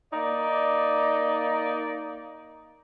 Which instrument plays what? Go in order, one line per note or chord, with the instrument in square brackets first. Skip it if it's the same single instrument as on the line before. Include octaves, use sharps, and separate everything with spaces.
[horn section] A#3 D#4 D5